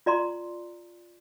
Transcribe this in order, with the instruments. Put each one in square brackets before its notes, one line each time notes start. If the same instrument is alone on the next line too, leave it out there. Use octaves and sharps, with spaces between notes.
[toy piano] F4 D5 A#5 C6